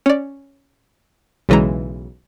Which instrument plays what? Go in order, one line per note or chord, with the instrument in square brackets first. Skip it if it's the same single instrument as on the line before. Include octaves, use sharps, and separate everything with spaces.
[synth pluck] C#4 D5
B1 C#3 E3 G#3 A#5